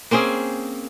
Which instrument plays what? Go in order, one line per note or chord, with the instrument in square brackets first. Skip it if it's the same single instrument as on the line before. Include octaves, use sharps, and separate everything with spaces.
[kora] A#3 C4 C#4 G#4